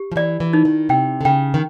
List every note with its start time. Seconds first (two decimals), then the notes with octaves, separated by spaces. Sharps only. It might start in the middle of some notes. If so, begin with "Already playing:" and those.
Already playing: G4
0.12 F3
0.16 E3 D5
0.40 E3
0.53 D#4
0.65 D#3
0.89 C3 G5
1.21 D3
1.25 C#3 G5
1.54 D#3